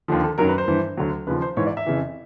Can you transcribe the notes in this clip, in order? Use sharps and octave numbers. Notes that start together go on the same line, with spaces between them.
D#2 D3 F3
A4
F#2 D#3 F#3 A#4
B4
C5
G2 E3
D2 D3 F#3
D#2 C#3 F3 B4
C5
G#2 E3 C#5
D5
E5
F2 C#3 E3